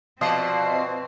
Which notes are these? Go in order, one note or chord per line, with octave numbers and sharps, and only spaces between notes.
B2 F3 C4 C5 D5 D#5 F5 C7